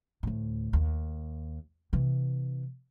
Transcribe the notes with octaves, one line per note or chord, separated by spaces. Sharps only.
D2 A2
D#2
C3 E3